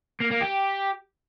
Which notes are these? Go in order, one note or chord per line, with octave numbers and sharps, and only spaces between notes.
A#3
A#3
G4